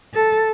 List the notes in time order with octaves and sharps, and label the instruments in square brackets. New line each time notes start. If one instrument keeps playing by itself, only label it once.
[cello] A4